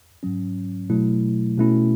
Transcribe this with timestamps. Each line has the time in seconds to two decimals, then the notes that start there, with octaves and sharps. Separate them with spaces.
0.23 G#2 F#3 C#4
0.90 B2 F#3 A3 E4
1.58 B2 A3 C#4 E4